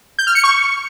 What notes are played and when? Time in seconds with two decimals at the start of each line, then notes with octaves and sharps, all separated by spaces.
0.19 G6
0.27 F6
0.35 C#7
0.44 C#6